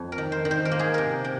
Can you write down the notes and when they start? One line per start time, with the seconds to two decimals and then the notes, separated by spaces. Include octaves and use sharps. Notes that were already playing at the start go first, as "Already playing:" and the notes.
Already playing: F2
0.12 A#4
0.18 D#3
0.32 C5
0.45 D#3
0.51 C5
0.65 A#4
0.71 A#3
0.79 G#4
0.94 C3 A#4
1.24 C3